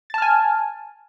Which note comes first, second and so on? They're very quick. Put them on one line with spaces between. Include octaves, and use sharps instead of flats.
A6 A5 F6 G#5